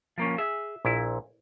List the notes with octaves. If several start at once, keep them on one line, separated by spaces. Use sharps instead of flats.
F3 A#3 C#4
G#4 E5
A#1 A#2 E4